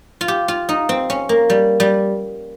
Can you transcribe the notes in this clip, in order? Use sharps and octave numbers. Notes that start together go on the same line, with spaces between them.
F4
G4
F4
D#4
C4
C#4
A#3
G3
G3